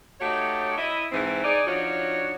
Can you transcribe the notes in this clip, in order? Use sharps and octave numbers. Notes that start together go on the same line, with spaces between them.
A3 D#4 F#4 G4 C#5
E4 D#5
G#2 E3 C4
D#4 G#4 D5
F3 D4 D#4 F#4 C#5